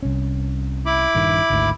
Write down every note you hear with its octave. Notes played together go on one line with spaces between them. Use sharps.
C2 C#4
E4 B5 D6
A#1 G2 D#3
G#1 D2 D#3